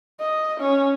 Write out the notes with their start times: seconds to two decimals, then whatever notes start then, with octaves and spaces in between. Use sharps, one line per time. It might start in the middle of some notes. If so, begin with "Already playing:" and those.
0.20 D#5
0.60 C#4